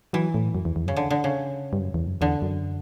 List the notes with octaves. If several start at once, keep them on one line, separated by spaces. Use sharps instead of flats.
E3 F#3
A2
F#2
E2
E2
F#2 C#3
D3
D3
C#3
G2
F#2
E2
F#2
E2 D3
F#2